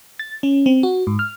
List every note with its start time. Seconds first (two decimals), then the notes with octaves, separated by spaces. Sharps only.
0.19 A6
0.43 C#4
0.66 C4
0.83 F#4
1.07 G#2
1.19 F6